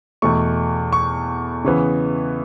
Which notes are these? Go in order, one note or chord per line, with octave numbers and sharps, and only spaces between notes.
E2 B2 A3 C#6
C#6
C#3 E3 B3